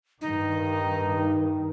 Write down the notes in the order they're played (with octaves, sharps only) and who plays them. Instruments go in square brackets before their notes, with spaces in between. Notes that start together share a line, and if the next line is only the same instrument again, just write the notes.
[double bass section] G2 D#3 [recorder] D#4